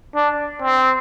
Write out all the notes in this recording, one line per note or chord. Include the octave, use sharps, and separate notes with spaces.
D4
C4